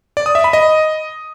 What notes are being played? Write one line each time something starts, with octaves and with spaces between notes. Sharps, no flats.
D5
D#6
E5
B5
D#5